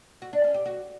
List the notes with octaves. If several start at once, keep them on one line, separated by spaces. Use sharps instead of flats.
F#4
D4
C#4
G4
F#4